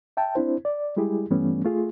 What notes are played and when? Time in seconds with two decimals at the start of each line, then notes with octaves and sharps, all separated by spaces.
0.17 E5 G5 A5
0.35 C4 D4 E4 C5
0.65 D5
0.96 G3 G#3 E4 G4 G#4
1.30 G2 E3 G3 A3 B3 C#4
1.65 A3 F4 G#4